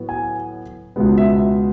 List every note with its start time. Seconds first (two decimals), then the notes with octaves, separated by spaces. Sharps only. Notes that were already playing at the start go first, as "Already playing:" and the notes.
Already playing: A2 F#3 B3
0.09 G#5
0.96 C#2 B2 G#3 B3
1.18 E5